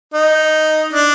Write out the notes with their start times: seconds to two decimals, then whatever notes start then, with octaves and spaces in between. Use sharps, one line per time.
0.14 D#4
0.93 D4